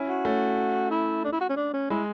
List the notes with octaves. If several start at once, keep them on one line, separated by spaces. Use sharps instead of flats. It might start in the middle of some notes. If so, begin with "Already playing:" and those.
Already playing: C#4 E4
F#4
A3 C#4
E4
D4
E4
F#4
C#4
D4
C#4
G#3 E4